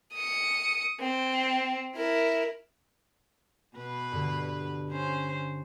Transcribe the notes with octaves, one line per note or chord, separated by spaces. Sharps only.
D#6 C#7
C4
E4 A#4
B2 B4
G2 D3
C#4 C5